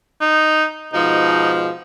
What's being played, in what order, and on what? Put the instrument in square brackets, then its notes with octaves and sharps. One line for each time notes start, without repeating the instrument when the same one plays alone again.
[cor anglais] D#4
[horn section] G#2 B2 F3 [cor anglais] D#4